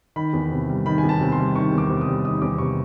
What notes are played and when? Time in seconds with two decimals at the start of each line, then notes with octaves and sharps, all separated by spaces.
0.16 D#3 B5
0.33 E2
0.52 C3
0.69 G3
0.86 D#3 B5
0.98 G#5
1.04 E2
1.09 A5
1.21 C3
1.32 C6
1.38 G3
1.55 D#3 C#6
1.72 E2
1.78 D6
1.89 C3
2.01 D#6
2.08 G3
2.25 D#3 D#6
2.42 E2 D6
2.58 C3 C#6